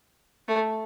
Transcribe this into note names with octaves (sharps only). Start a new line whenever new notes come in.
A3